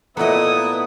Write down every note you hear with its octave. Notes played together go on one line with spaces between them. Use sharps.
A#2 A3 B3 E4 D#5 F#5 A#5 D#6